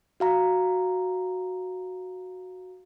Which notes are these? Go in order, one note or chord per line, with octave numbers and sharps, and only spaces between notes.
F#4 F5 A#5